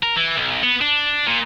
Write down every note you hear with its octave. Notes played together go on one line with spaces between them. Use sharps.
A#4
E3
B1
B3
D4
A#2